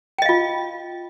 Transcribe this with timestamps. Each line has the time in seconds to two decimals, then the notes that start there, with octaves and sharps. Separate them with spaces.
0.18 G5
0.22 D#5
0.25 F5
0.29 F4